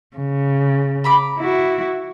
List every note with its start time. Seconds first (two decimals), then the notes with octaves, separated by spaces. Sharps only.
0.16 C#3
1.04 A#5 B5 D6
1.39 E4 F#4